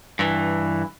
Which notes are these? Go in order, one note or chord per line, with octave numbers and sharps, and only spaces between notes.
G2 E3